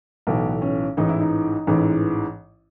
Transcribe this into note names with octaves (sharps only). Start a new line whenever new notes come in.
B1 A2 E3 B3
C#4
A1 G#2 E3 D#4
E4
D#4
A1 G#2 E3